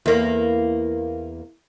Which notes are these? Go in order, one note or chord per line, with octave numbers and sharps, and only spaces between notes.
E2 A#3